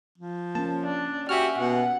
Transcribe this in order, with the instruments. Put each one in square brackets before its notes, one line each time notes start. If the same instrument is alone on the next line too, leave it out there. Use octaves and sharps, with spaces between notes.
[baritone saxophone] F3
[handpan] A#3 C#4 [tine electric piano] A5
[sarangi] D4
[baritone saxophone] F#4 [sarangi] G4 [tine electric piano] E5 G#5 F6
[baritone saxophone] B2 [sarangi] F#5